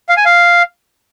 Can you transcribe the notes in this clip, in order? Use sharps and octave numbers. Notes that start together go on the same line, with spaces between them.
F5
G#5
F5